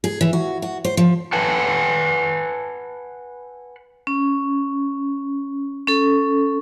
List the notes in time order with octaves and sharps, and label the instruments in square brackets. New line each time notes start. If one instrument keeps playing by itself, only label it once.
[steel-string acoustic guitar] G#4
E3
F#4
F#4
C5
F3
[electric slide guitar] B4 F#5 G#5 A5
[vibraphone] C#4
C#4 A4